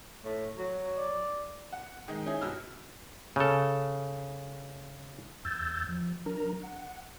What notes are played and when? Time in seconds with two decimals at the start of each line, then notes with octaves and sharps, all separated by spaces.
0.25 A2
0.58 F#3
0.98 D5
1.72 F#5
2.08 D#3 G#3 D#4
2.26 C#4 D#4 E4 G#4
2.41 G2 B2 F#4 E6 F6
3.36 C#3 A4
5.45 E2 E6 G6 A6
5.89 F3
6.26 F#3 D4 A#4 A#5
6.62 F#5